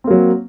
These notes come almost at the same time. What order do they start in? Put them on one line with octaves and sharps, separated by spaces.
C4 A#3 F#3